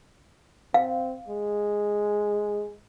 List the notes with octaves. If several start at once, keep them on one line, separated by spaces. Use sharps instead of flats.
C4 F5
G#3